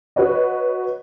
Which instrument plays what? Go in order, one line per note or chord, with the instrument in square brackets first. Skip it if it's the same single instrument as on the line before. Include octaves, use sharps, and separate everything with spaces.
[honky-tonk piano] F#4 B4 C#5 D#5